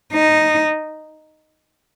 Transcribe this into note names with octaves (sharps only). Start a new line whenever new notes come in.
D#4